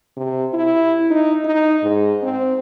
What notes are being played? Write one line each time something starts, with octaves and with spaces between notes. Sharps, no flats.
C3
E4
D#4
D#4
G#2
C4